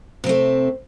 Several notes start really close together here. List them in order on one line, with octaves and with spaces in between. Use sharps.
C3 C4 A3